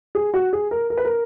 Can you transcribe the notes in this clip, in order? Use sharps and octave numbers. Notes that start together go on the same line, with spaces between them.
G#4
F#4
G#4
A#4
A#4
B4
A#4